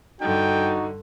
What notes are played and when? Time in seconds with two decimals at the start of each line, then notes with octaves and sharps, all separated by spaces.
0.21 G2 D3 D#4 F#4 G5